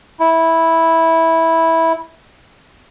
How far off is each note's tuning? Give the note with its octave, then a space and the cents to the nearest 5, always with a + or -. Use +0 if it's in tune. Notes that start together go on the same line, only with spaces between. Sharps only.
E4 -10